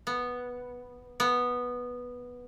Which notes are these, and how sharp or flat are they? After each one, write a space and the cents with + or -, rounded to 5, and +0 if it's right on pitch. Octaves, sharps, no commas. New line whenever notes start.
B3 -5
B3 -5